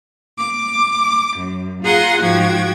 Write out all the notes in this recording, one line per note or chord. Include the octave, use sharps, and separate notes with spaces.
D6
F#2
F4 G#4 F#5 A#5 C6
G#2 F3 F#4 G5 G#6